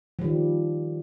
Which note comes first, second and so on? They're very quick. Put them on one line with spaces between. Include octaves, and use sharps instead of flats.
F3 G3 D#3